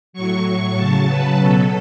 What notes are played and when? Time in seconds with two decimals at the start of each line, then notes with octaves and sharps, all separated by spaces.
0.13 A2 F#3 C#6
0.77 C#3 F#3 A5
1.08 B4
1.40 B2 F#3 A4